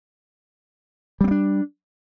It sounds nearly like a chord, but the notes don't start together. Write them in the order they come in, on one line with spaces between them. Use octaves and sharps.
G3 C4 A#3 D4